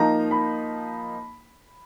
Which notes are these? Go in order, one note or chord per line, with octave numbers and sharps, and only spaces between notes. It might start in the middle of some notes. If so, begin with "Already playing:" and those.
Already playing: F3 A#3 D#4 A#5
B5